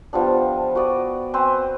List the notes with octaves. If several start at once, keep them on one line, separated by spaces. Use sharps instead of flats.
F3 G3 B3 D4
F#4 B4 D5 D#6
C4 B4 C5 G#5